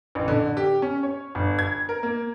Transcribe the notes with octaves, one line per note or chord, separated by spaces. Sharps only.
A1
D3
G4
C#4
C#5
G1
G#6
A#4
A#3